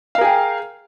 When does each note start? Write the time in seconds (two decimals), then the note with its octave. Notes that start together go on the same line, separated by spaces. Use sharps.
0.15 F5
0.18 A#4
0.21 G#4
0.24 G5